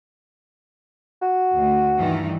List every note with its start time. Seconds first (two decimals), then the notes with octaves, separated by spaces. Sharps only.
1.22 F#4
1.53 D2
1.96 G2 D#3 E3